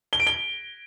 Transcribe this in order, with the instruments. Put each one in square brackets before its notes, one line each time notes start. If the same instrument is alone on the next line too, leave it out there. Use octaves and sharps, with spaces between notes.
[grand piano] G7
D7
G7